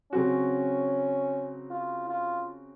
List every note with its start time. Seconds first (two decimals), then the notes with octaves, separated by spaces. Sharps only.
0.12 C#3 F#3 C4 C#4 F#4
1.71 F4
2.09 F4